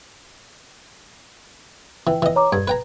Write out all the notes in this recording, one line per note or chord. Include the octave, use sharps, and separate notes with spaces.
E3 G5
E3 D#5
C#5 A#5 D6
G2 G#6
B4 G5 A#5